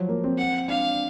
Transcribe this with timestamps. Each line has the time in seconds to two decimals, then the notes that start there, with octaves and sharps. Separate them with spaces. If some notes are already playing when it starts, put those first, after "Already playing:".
Already playing: F3 F#3
0.09 A#3
0.24 C4
0.38 F#5
0.68 D4 F5